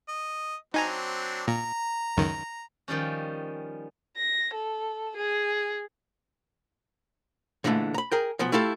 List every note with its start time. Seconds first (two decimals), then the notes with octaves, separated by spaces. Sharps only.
0.09 D#5
0.74 F#3 C4 D4 D#4 G#5 A#5
1.48 A#2 A#5
2.17 C#2 F#2 D#3
2.88 D#3 F3 G3 C#4
4.17 A#6
4.54 A4
5.17 G#4
7.64 A#2 D3 E3 G#3 A3
7.94 A#5 B5
8.12 G#4 A#4 G5
8.39 B1 F3 B3
8.52 A3 E4 F4 G4 A4